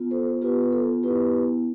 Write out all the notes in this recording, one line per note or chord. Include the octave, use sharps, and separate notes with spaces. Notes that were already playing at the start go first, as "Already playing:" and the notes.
Already playing: B3 F4
A4 C5
B3 F4 G4 B4
B4
A4
B3 E4 G4 B4